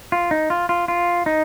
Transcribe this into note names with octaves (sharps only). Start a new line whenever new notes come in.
F4
D#4
F4
F4
F4
D#4